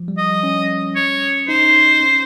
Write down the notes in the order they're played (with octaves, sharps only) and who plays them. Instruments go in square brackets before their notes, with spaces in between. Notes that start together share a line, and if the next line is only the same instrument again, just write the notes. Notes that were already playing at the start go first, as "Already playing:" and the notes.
Already playing: [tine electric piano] F3
G3
[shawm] D#5
[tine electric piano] C#4
[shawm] C#5
[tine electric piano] D#4 [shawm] C5
[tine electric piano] C#4